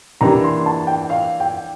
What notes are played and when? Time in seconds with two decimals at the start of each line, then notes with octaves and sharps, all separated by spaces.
0.21 E3 A#3 D4 G4 A#5
0.44 C6
0.66 A5
0.87 G5
1.10 F5
1.40 G5